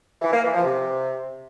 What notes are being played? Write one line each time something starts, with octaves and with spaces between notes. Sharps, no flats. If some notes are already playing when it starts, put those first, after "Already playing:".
E3
A#3
E3
F3
C3